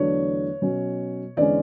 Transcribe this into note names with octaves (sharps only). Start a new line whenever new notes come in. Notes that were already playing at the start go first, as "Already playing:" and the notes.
Already playing: E2 D3 F#3 A3 D4 C#5
B2 F#3 C#4
E2 D3 G#3 C#4 D5